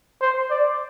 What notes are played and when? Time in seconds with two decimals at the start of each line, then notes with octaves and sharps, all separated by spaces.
0.21 C5
0.50 D5